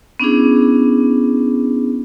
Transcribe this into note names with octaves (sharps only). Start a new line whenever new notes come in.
B3 C#4 D4 E4 G#4